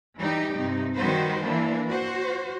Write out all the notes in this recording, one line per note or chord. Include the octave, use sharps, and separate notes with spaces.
E3 G3 D#4 G4
G2 C3 D#4
D#3 G3 F#4 B4 C5
E3 A#3 D4
F#4 C5